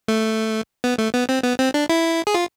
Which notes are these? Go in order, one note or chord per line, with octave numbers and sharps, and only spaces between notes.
A3
B3
A3
B3
C4
B3
C4
D4
E4
G#4
F4